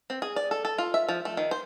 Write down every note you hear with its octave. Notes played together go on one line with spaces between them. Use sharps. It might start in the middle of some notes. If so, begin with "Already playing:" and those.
C4
G#4
D5
A4
A4
F4
E5
F3
A3
D#3
C5